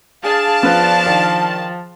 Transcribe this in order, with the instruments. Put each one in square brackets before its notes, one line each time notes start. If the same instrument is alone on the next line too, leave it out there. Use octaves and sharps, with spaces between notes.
[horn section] D4 F5 [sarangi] G#4 [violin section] A5
[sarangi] F3 [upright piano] B3 F4 F#6
[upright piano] D#3